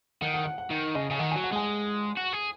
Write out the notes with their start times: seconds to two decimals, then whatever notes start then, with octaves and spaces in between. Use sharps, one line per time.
0.21 D#3 F#5
0.34 F#5
0.46 F#5
0.58 F#5
0.71 D#3
0.95 C#3 D#5
1.11 C#3 G#5
1.19 D#3 F#5
1.31 G#5
1.36 F#3
1.44 F#5
1.53 G#3 G#5
2.17 F#4
2.33 G#4